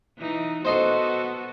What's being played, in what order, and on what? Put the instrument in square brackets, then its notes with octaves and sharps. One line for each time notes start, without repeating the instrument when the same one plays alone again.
[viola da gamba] E3 D#4
[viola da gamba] B3 F#4 A4 [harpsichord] C5 D#5 C6